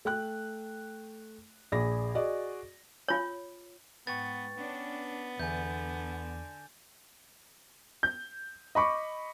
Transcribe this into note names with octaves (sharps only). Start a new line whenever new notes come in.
A3 G5 F#6
A#1 G#4 D5 B5 A#6
F#4 G#4 D5 D#5
F4 C#5
G#2 B3 B4 G5 C#6 A6
B3 C#4 D4
E2 D3 G#5 G6
G6
D#5 B5 C#6 D6